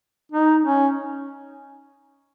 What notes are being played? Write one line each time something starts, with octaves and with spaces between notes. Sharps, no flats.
D#4
C#4